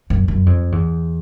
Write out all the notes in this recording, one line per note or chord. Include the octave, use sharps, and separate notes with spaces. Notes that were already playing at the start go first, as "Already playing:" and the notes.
F#2
F#2
F2
E2